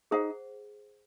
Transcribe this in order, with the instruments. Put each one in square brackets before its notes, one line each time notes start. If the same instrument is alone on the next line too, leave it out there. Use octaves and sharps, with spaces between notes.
[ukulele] D#4 [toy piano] G#4 C5 F#5